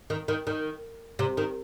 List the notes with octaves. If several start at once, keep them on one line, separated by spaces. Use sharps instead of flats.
D#3
D#3
D#3
C3
D#3